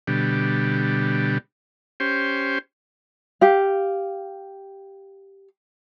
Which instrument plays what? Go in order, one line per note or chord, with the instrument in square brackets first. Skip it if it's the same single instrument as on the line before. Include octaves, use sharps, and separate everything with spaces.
[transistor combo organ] B2 D3 G3
C#4 G4 C5
[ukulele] G4 F5